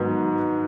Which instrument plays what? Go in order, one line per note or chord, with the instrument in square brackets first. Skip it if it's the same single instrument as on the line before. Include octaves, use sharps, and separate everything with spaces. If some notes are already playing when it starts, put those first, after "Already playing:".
Already playing: [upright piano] G#2 D#3 F#3 B3